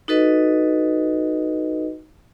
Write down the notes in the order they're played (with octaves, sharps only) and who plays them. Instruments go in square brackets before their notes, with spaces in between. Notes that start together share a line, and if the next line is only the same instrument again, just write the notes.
[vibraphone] D#4 F#4 A4 B4 D#5